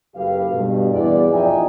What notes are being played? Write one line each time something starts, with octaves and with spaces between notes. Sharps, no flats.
F#1 F#3 G4 A4 B4 F5
G2 B2
E2 B3 D5
A1 F3 D#4 E5 G5 G#5